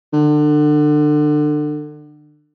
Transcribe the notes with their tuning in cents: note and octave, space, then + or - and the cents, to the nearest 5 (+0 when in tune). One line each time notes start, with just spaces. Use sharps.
D3 +30